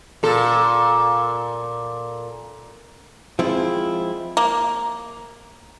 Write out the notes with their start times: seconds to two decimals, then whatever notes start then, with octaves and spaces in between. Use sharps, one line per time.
0.23 A#2 A4
3.39 F3 G#3 C4 E4
4.37 A#3